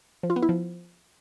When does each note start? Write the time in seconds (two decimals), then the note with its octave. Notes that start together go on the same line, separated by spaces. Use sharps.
0.23 F3
0.30 F4
0.36 B3
0.43 E4
0.49 F3